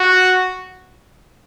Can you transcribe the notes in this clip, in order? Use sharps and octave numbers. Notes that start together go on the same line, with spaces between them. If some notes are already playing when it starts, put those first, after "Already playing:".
Already playing: F#4